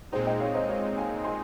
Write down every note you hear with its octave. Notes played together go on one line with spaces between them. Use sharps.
A#2 G#3 C4 D#4 G#4 C5
D#5 G5
C#5 F5
C5 D#5
C#5 F5
F5 G#5
G#5 C6